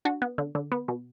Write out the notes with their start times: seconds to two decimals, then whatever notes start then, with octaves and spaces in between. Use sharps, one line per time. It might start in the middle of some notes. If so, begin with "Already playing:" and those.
0.05 D4 F#4
0.22 B3
0.38 D3
0.55 D3
0.72 B3
0.88 B2